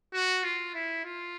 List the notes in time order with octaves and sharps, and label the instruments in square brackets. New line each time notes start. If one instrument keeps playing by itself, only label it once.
[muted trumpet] F#4
F4
E4
F4